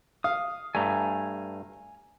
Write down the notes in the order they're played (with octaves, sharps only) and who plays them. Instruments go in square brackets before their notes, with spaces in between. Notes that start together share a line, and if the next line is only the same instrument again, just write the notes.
[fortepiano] F5 [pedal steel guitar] D#6
[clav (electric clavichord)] G2 A3 [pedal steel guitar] G#5 A#5